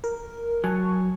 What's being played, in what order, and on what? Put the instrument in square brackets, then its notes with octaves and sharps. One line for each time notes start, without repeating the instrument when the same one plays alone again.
[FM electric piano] A#4
[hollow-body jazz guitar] F#3 [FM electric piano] G#5 A5 C#6